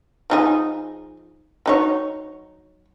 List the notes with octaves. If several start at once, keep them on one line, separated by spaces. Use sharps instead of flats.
F3 D#4 G#4
F#3 D#4 C#5